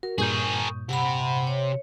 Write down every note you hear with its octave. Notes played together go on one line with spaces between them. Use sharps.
F#4 A#4
G2 A#2 G#4 A#4 C#6 D#6 G6
C3 F#5 B5
C#5